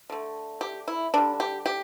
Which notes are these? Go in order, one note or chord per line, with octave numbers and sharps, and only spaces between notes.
D3 A3
G4
E4
D3 G3 D4
G4
G4